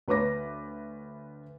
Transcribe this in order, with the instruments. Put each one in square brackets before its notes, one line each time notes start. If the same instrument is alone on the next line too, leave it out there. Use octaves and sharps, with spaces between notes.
[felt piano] D2 B4 C#5 D6 A#6